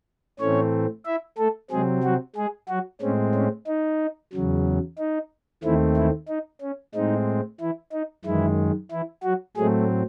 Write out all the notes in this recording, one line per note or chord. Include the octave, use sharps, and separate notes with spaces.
A2 E3 A3 C4 C#4 C#5
E4 E5
A3 A4
C3 F#3 G#3 C4 G#4
F#3 F#4
G#3 G#4
F#3 F#4
A2 G#3 C4 C#4
C#4
D#4
E2 C#3 F#3
D#4
D#2 D#3 E3 A3 C4 E4
E3 E4
D#4
C#4
A2 G#3 C4 D#4
E3 E4
D#4
F#2 D#3 E3 G#3 E4
E3 E4
F#3 F#4
A2 F#3 G#3 A3 C4 G#4